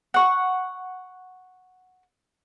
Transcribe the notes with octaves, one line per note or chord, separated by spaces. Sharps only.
F#5 C#6